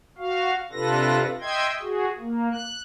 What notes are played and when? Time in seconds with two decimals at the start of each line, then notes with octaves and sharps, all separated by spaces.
0.18 F#4 F5
0.72 C3 D4 F4 A4 B4 A#6
1.41 D#5 E5 G5 C6 G#6
1.81 F#4 G#4
2.18 A#3
2.52 F#6